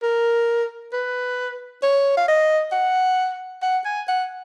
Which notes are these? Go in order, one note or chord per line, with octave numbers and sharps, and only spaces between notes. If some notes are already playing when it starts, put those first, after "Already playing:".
A#4
B4
C#5
F5
D#5
F#5
F#5
G#5
F#5